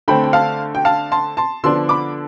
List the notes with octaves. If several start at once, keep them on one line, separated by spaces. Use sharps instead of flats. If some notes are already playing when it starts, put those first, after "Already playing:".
D3 A3 C4 G5 B5
G5
F5 A5
G5
F5 A5
A5 C6
A5 C6
D3 F3 B3 D4 C6 E6
B5 D6